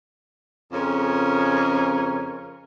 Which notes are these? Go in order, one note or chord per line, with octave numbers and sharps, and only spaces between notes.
F2 C#3 C#4 A#4